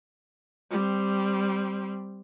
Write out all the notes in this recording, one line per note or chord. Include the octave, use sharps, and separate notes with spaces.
G3 C4